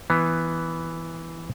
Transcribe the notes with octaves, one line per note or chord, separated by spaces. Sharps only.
E3 B3